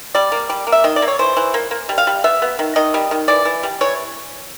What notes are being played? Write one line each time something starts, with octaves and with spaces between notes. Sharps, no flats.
G3 D5
A#3
G3
A#3
E5
D#3 D#5
D5
A#3
C#5
E3 C5
E3
A#3
A#3
G3
F5
G3
B3 E5
B3
D#3
D#3 D#5
G3
D#3
E3 D5
E3
G3
E3 C#5